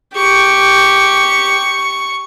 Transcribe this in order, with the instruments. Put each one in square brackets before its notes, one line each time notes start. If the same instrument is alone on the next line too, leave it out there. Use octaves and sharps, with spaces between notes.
[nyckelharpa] G4 [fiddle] C#6